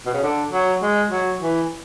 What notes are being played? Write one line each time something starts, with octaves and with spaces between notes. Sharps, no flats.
B2
C#3
D3
F#3
G#3
F#3
E3